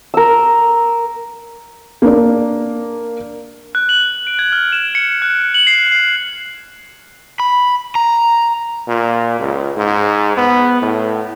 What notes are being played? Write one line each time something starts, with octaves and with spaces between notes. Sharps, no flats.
A#4 E6
A#3 D4 A#4
F#6
F#7
D7
G#6
F6
E7
C#7
F#6
F#7
C7
C7
B5
A#5
A#2
C#2
G#2
B3
A2